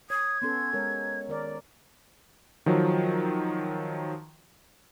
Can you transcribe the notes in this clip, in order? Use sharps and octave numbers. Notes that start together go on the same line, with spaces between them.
C#5 D#6 G#6
B3 C#4 A4 C6
G#3 A#4 C#5
D#3 A#4 D5
D#3 F3 F#3